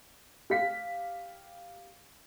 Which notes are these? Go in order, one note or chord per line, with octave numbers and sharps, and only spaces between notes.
G4 F5 B6